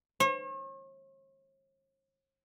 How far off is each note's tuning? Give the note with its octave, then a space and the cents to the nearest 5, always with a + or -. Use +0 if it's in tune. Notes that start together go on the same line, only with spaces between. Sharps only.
C#5 -45